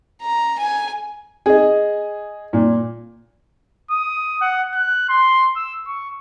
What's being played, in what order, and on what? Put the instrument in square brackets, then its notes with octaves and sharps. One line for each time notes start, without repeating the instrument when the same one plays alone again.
[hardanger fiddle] A#5
G#5
[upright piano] G#4 D#5
A#2
[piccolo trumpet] D#6
F#5
F#6
C6
E6
C#6